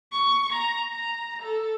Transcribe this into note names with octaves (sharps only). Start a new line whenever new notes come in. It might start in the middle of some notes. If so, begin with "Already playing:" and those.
C#6
A#5
A#5
A4